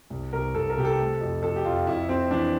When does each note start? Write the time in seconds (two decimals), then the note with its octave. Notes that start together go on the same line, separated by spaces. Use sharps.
0.10 C2
0.33 C2 A#4
0.55 C2 A4
0.70 A#4
0.77 C3 G4
0.85 A4
0.99 A3
1.21 F2
1.42 F2 A4
1.56 G4
1.65 F2 F4
1.86 F2 E4
2.09 F2 C4
2.31 E3 D4